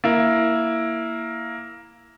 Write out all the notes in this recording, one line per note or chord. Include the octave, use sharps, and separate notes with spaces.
A#3 E4